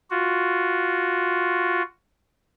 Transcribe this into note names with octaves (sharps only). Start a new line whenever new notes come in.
F4 F#4